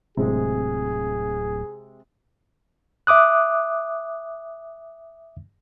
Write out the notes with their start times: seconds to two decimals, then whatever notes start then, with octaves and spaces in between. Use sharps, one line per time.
0.17 D1 C3 G#3 G#4
3.07 E5 D6 D#6 F#6